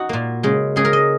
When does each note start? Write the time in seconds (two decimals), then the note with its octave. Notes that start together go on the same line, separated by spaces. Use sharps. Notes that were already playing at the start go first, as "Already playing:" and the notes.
Already playing: D#4 F#4
0.09 A#2 A#3
0.43 C#3 G#3
0.76 C#3 G#3 G#4
0.85 A#4
0.93 D#5